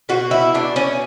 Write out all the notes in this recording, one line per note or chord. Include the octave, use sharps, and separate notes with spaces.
B2 F#4
E4
B2 D4
C#4